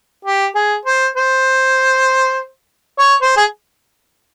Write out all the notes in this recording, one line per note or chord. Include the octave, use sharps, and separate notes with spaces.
G4
G#4
C5
C5
C#5
C5
G#4